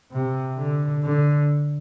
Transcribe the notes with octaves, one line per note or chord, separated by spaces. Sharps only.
C3
D3
D3